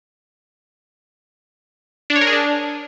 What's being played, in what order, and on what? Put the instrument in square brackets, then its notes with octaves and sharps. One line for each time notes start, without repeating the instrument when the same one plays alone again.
[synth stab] D4
C#5
A#4
G#4
D4